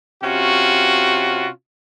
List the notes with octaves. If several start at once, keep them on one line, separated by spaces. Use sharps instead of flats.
C3 C#4 F4 F#4